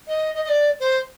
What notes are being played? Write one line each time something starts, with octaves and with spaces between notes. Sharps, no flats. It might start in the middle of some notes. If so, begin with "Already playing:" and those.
D#5
D#5
D#5
D5
C5